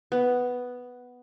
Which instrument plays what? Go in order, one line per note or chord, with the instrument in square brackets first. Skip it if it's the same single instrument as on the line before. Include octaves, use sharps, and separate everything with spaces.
[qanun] B3